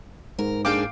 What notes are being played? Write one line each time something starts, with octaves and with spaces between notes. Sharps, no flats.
G#2 A#4
A#3 D4 G#4 F5 G5 D6